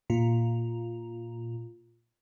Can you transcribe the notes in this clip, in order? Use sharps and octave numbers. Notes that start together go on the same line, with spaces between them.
A#2 F4